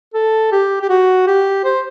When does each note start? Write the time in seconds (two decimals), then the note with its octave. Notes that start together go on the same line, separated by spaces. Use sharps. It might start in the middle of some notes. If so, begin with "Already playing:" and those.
0.14 A4
0.52 G4
0.82 G4
0.90 F#4
1.27 G4
1.64 C5